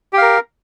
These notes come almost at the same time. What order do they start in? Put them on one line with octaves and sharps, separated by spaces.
G4 F5 A#4